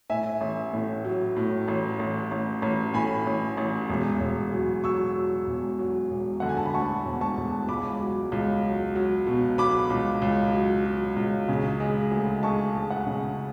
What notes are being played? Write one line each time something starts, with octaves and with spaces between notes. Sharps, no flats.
A2 E5 G#5
A1
A2
F#3
A2
A1
A1
A1
A1
A2 G#5 B5
A1
A1
E1
E1
F#3
F#3 C#6 E6
F#3
E1
F#3
E1
D3 F#5
G#5
A5
B5
D2 A5 C#6
E1
A5 C#6
E1
C#2 B5 D6
F#3
C#2
F#3
F#3
B2
F#3 B5 D6
C#2
C#2
F#3
F#3
C#2
C#3
G#3
D2
G#3 A5 C#6
G#3
F#5
C#3